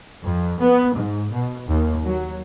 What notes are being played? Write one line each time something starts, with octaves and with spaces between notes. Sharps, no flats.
F2
B3
G#2
B2
D#2
F#3